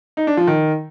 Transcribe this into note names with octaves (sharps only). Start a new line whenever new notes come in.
D#4
D4
F3
D#3